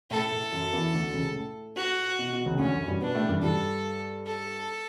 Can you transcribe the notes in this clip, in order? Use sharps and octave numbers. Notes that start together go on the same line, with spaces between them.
A2 A3 A4
A2 A3
F#2 F#3
E2 E3
D2 D3
C#2 C#3
A2
F#4
B2
B2
C#2 C#3
D2 D3 C#4
F#2 F#3
G2 G3
B2 B3 D4
A2 A3
G2 G3
G2 G3 A4
A4